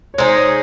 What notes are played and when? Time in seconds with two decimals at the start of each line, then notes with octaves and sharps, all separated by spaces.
0.14 C#5
0.18 G#3 D#4 G#4 C5
0.36 C#5